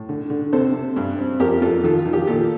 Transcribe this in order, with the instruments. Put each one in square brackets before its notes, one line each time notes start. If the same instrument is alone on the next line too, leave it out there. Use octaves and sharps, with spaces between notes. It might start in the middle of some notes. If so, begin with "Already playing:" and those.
Already playing: [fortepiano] A2
D3
D3
C3 A4 C5
C3
G2
C4
F2 G4 A#4
F2 F4 A4
D#3 F4 A4
F4
D#3
G4
A#2 F4 A4